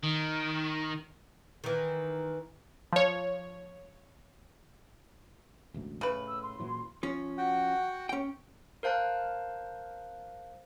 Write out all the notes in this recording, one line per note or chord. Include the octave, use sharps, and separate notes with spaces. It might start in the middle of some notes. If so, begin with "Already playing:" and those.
D#3
D#3 E3
F3 C#5
E1 A1 D2
A2 C#3 B4
E6
C6
A#2 E3 F#3
F3 C#4
F#4 F#5 G5
C#4 G5
A#4 C5 F5 A5 F#6